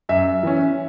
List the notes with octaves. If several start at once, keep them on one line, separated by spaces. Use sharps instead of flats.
F#2 E5
E3 C#4